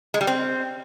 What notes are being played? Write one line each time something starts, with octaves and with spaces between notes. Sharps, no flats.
G#3
G3
C4